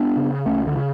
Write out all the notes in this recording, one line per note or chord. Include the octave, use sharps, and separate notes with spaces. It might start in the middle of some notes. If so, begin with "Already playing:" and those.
Already playing: B3 D4
C#3
C#2 A3 C#4
D3
C#3